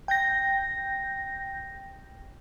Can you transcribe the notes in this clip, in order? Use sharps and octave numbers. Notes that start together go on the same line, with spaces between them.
G5 G6 A#6